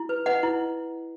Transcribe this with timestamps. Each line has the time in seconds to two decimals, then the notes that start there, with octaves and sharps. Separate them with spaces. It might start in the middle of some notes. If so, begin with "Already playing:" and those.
Already playing: E4
0.09 B4
0.26 B4 D#5 F#5
0.43 E4